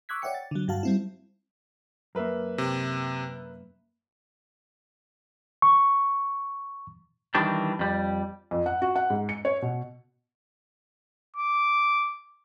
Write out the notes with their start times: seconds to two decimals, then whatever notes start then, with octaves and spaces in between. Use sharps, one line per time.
0.09 C#6 D6 E6 F#6 G#6 B6
0.22 C#5 D5 E5 F#5 G5 C#7
0.34 A6
0.51 D3 F#3
0.68 G2 F#4 F5 A5
0.83 G3 C4 E4
2.15 F#2 A#3 A#4 B4 E5
2.58 C3
5.62 C#6
7.35 D#3 E3 G3 D4
7.79 F2 G3
8.51 F2
8.66 F#5
8.82 F#4
8.96 F#5
9.10 G#2
9.29 C#7
9.45 C#5
9.62 B2
11.37 D6